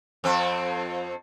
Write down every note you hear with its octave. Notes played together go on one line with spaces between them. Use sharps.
F2 C4